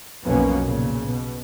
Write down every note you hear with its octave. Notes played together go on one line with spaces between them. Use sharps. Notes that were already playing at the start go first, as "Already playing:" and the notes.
B1 F2 B2 A#3 B3 C#4
A#2 C#3
B2